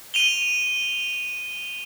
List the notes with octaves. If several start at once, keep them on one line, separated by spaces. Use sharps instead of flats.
D#7 F7 G7